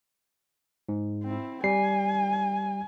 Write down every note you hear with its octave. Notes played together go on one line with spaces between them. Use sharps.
G#2
C4 E4
G3 G#5 C7